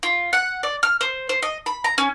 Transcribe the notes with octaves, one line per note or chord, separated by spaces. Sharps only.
F4
F#5
D5
F6
C5
C5
D#5
B5
A#5
C#4